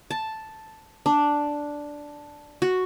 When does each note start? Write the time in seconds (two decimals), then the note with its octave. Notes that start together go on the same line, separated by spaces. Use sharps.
0.11 A5
1.06 D4
2.62 F#4